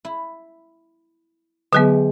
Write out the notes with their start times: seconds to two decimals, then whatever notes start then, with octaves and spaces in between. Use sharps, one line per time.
0.05 E4
1.73 D3 F#3 G#3 B3 G4 E5